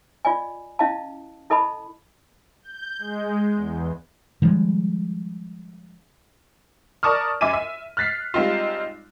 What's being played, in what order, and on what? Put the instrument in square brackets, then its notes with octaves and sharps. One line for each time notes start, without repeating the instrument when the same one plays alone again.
[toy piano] F4 D5 D#5 G#5
C#4 E4 D#5 F5 A5
E4 A4 D#5 A5 B5
[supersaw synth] G6
G#3
E2
[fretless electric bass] D#3 F3 G3 G#3
[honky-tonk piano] A#4 D5 A5 C#6 D#6 F6
F#2 E5 G#5 D6 D#7
E5
F6 F#6 A6 B6 C7
G3 G#3 C4 D#4 F4